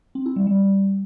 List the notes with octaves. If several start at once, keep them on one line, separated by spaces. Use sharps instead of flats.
C4
E4
G3
G3